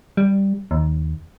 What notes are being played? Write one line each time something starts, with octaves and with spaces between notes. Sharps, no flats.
G3
D#2